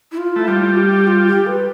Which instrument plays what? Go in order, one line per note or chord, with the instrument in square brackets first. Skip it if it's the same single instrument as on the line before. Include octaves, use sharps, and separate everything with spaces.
[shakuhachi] E4
F4
[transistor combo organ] A3 [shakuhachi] E4
[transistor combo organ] G3 [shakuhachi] F4
[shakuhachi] G4
F4
G4
B4